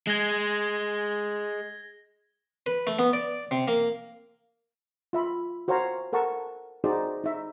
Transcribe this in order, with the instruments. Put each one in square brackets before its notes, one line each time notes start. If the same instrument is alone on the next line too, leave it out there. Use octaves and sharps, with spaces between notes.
[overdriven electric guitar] G#3 [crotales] G#6 A#6 G7
[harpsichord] B4
A3
B3
D5
C3
A#3
[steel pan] F4 E5 B5
F#4 C5 C#5 F5 A#5
A4 A#4 F#5 A5 C#6
D#4 F#4 G#4 C5 D5
D#4 E5